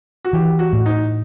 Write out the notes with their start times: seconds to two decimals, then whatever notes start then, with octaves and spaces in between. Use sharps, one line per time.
0.25 F#4
0.33 E3 G4
0.59 F#4
0.73 A2
0.86 D#4